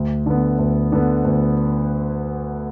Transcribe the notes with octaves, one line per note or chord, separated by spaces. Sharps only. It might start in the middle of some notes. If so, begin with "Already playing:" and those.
Already playing: D2
D3 B3
D2
D3 B3
D2